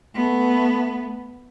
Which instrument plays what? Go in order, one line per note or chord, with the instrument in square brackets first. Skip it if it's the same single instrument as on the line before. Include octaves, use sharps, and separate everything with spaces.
[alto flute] A3 [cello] B3